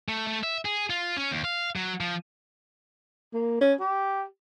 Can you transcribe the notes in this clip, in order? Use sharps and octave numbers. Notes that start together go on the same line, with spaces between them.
A3
A3
E5
G#4
F4
C#4
D#2
F5
F#3
F3
A#3
C#4
G4